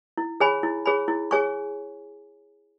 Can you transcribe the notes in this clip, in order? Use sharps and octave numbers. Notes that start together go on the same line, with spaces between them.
E4
G#4 C#5 G#5 B5
E4
G#4 C#5 G#5 B5
E4
G#4 C#5 G#5 C#6